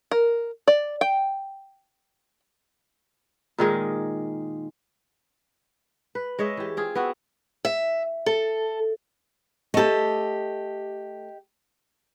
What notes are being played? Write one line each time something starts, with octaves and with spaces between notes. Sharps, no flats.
A#4
D5
G5
A#2 D#3 G#3 D#5
B4
G#3 C#5 D#5 E5
E3 G4
C4 F4 G#4
B3 C4 F#4 E5
E5
A4
A3 G4 A4 D#5